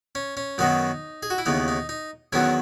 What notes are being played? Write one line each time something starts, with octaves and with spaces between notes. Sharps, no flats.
C#4
C#4
F#2 D#3 F#3 B3 D#4
G#4
F#4
E4
D#2 C#3 E3 B3 D#4
D#4
D#4
E2 D#3 F#3 B3 C#4 E4